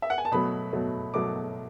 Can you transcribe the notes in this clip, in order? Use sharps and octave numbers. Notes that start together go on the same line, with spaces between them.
E5
F#5
G#5
A5
B2 F#3 A3 B5
B2 F#3 A3
B2 F#3 A3 D6